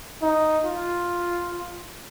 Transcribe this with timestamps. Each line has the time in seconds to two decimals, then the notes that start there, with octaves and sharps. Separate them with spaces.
0.22 D#4
0.65 F4